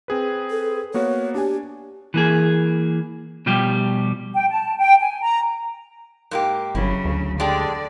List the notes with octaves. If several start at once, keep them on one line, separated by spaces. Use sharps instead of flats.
C4 G#4 B4
A4
A#3 B3 F#4 C#5
D4 G4 G#5
E3 A#3 G#4
B2 F3 G3 G4
G5
A5
G5
G#5
A#5
G#2 A#3 G4
G1 C#3 F#3 E4
D2
D3 G#3 D4 G4 D5